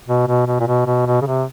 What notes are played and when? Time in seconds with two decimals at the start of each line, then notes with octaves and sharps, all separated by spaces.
0.07 B2
0.27 B2
0.47 B2
0.60 A#2
0.67 B2
0.86 B2
1.06 B2
1.21 C#3
1.26 C3